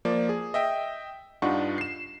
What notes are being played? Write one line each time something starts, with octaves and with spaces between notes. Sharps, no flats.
F3 A#3 D5
G#4
D#5 E5 G5
G2 D4 D#4 F4 F#5 C#6
C7 E7